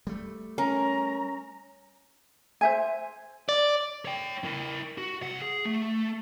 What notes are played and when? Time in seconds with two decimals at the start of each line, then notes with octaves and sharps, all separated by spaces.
0.07 G3 A3
0.58 C#4 A#4 A#5
2.61 C5 E5 G#5
3.49 D5
4.05 C#5 G5
4.44 E4 A#4
4.98 F#4
5.22 C2 F#5
5.42 G#4
5.65 A3